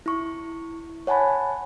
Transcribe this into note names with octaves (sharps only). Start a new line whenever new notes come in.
E4 C#6
C#5 F#5 G#5 A5 B5